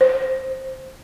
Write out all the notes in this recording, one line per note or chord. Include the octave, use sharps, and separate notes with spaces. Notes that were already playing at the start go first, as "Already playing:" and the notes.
C5